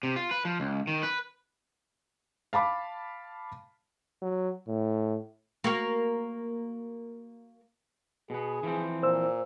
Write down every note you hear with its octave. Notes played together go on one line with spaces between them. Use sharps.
C3
F4
B4
F3
C#2
D#3
B4
F5 A5 B5 D6
F#3
A2
A#3 F#4 A#4
B2 B3 G#4
E3 F3 C4
A#2 C5 E6